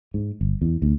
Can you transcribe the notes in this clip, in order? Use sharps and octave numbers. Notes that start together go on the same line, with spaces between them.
G#2
G1
E2
D2